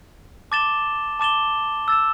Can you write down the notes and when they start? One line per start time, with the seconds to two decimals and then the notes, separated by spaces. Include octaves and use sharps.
0.51 A5 D6 A6 E7 G7
1.19 A5 D6 A6 E7 G7
1.88 E6 A6 E7